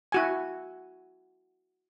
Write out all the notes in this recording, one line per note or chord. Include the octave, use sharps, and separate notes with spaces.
E4 F#4 G#5